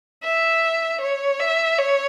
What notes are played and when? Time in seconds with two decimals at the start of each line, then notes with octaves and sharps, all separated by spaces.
0.24 E5
1.01 C#5
1.40 E5
1.78 C#5